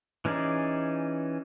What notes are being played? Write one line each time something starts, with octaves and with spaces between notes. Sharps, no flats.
E3 C#4 D#4 G#4 D5